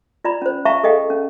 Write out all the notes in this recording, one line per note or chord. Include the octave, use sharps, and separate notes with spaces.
F4 D5 A#5 B5
C#4 C5
E5 F5 G5 A5 A#5 C#6
G#4 A4 D#5 F5 G5
C#4